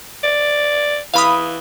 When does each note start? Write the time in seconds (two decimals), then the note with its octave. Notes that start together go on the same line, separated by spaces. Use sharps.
0.23 D5
1.14 E3 F5 B5 D#6